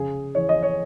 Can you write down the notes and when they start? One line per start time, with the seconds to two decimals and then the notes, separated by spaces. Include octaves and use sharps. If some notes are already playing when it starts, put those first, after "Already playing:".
Already playing: C#3 G#4
0.35 E3 C#5
0.49 D#5
0.63 C#5